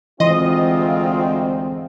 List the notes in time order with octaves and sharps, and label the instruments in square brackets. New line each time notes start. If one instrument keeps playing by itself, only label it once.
[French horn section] D2 G#3 C4 [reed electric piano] E3 C6 [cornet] F4 [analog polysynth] D#5